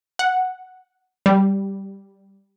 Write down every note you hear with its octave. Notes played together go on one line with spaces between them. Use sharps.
F#5
G3